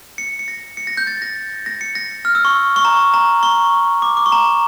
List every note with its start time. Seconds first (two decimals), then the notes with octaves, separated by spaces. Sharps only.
0.18 C#7
0.39 C#7
0.48 A#6
0.77 C#7
0.87 A#6
0.97 G6
1.07 A6
1.22 A#6
1.66 A#6
1.81 C#7
1.95 A#6
2.25 F6
2.35 E6
2.45 C#6
2.76 C#6
2.85 A#5
3.14 A#5
3.43 C#6
4.02 D6
4.17 D6
4.26 C#6
4.32 A#5